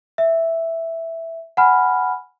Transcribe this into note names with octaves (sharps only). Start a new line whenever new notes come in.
E5
F#5 G#5 B5 F6